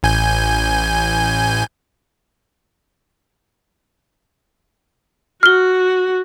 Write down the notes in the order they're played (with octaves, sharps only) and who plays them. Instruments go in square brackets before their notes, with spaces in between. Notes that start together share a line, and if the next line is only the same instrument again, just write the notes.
[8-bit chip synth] A1 G#5 G6
[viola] F#4 [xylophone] F6 G7